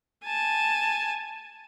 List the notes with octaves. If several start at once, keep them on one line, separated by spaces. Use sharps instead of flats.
G#5 A5